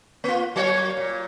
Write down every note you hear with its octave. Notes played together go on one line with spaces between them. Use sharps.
A#3 F4
F#3 A#3 C#5
A#2